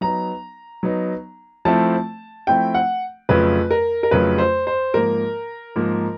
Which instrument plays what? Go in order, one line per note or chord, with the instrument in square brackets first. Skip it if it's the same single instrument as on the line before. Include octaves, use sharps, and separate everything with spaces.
[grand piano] F#3 B3 D#4 [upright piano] A#5
[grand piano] F#3 B3 D#4
[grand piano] F3 A3 C4 E4 [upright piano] A5
[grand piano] F3 A3 C4 E4 [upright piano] G5
[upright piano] F#5
[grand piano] F2 C#3 F#3 A3 [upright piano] B4
[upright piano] A#4
A#4
[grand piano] F2 C#3 F#3 A3 [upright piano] B4
[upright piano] C5
C5
[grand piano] G#2 F3 A#3 [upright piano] A#4
[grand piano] G#2 F3 A#3